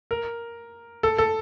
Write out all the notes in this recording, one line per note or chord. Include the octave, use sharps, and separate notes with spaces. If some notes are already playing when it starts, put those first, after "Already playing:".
A#4
A4
A4